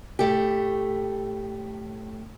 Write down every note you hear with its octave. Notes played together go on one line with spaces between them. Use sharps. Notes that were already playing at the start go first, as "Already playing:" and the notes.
A2 A3 G4